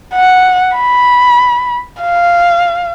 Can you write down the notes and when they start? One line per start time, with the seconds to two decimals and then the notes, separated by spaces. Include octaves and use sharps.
0.13 F#5
0.76 B5
2.02 F5